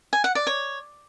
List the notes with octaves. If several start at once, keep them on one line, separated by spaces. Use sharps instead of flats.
G#5
F#5
D5
C#5